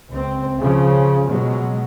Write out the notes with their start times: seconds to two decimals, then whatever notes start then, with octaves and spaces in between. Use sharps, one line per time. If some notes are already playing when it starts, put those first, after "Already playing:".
0.10 C#2 C4
0.60 C#3 F3
1.27 B2 F#3 G#3